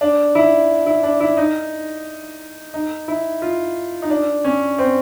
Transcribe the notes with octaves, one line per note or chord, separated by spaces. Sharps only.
D4
E4
E4
D4
E4
D#4
D#4
E4
F4
D#4
D4
C#4
C4